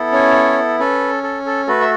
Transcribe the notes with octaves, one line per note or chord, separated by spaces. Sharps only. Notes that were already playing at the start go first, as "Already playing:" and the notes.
Already playing: B3 E4 A4
C#4 C#5
C#4 A4 B4
A4
A4
A3 F#4 A4 B4
E5